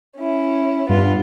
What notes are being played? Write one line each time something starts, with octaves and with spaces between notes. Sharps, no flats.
C#4 E4
G2 B3 F4